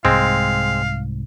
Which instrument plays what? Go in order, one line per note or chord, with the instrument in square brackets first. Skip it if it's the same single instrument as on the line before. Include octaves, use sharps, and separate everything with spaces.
[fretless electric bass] C2 G#2 [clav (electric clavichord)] G#3 C4 [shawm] F5